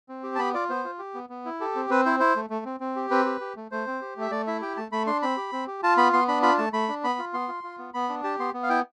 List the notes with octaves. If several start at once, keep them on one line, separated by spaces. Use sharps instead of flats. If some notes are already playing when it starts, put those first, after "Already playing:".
C4
G4
A5
B3 B5
F4 D5
B3 C5
F4
G4
B3
B3
E4
G4 A4
C4
C4 B4
E4 C5
E4 C5
A3
A3
C4
C4
G4
C4 B4
G4
G4
A3
A3 C5
C4
G4
A3 E5
A3 D5
E4 E5
G4 G5
A3 A5
A3 B5
D4 C6
C4 B5
G4
C4
G4
F4 A5
B3 B5
B3 C6
D4 B5
F4 B5
A3 A5
A3 B5
D4
B3 B5
F4
B3 C6
F4
F4
B3
B3 B5
D4
G4 A5
B3 C6
B3
F5
E4 G5